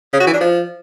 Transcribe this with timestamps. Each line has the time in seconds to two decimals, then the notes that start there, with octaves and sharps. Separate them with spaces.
0.13 C#3
0.20 F#4
0.27 E3
0.34 D4
0.40 F3